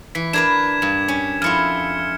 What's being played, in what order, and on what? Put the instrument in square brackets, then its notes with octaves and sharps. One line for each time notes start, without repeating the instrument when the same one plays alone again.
[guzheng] E3 [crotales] B6
[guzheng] D4 A#4 B4 [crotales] G#6 E7
[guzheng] G2
C#4
[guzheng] F2 E4 F4 [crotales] F6 C#7